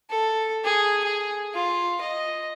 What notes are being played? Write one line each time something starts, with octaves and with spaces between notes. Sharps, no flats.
A4
G#4
G#4
F4
D#5